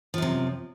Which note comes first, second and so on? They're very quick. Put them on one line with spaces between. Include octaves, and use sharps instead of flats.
F3 F#2 C3